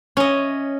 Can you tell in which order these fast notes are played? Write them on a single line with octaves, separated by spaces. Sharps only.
C#4 D#5 E5